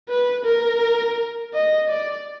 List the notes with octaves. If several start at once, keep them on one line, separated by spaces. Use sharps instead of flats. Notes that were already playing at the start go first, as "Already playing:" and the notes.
B4
A#4
D#5
D5